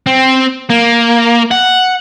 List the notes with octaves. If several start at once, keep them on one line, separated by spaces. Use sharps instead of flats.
C4
A#3
F#5